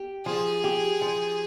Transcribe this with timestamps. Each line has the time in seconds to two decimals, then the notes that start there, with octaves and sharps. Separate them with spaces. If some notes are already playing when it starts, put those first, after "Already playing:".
Already playing: G4
0.26 F3 G#4
0.64 G4
1.02 F3